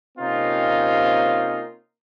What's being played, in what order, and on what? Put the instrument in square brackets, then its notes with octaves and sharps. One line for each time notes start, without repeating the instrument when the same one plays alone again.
[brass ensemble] C3 A#3 C4 C#4 D#4 F4